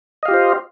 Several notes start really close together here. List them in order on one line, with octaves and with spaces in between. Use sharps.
D#5 F5 G4 F4 C5